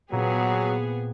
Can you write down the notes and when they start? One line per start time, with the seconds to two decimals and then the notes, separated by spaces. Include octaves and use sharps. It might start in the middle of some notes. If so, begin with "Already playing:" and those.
0.12 A#2 F#3 B3 C4 G#4